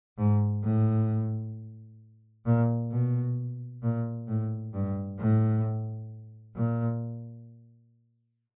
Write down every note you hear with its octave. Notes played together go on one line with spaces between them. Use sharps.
G#2
A2
A#2
B2
A#2
A2
G2
A2
A#2